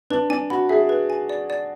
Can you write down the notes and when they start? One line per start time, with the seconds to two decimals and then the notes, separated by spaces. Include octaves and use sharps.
0.10 D4 B4
0.30 D4 G#5
0.50 F#4 B5
0.69 G#4 E5
0.89 B4
1.10 G#5
1.29 D5
1.50 D5